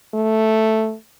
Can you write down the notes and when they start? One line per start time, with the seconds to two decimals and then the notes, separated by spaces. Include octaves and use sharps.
0.14 A3